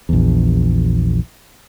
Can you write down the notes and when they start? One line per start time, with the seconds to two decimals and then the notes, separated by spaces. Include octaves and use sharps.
0.09 A#1 E2